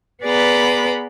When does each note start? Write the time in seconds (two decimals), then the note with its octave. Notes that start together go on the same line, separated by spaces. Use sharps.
0.23 B3 G#4 B4 D5 A#5 B5